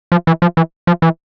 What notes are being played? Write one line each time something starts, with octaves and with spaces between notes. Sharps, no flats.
F3
E3
F3
E3
F3
E3